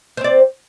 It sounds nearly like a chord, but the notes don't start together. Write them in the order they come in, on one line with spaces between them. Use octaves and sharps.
C5 C4 D5